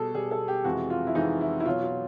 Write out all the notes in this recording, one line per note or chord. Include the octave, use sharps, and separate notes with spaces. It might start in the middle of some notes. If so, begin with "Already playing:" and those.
Already playing: B2 G3 G#4 A4
B2 G3 G#4
A4
G4
F2 C3 E3 G#3 F#4
F4
E4
F2 C3 E3 G#3 D#4
E4
E4
B2 F#3 F4
F4